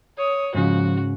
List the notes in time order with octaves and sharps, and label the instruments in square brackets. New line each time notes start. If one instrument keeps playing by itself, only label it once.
[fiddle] C#5 [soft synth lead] D#6
[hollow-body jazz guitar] G#2 C#3 [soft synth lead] F3 [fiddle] F#4